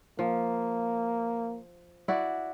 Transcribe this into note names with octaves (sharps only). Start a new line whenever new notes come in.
F3 A#3
E4 F#4 D5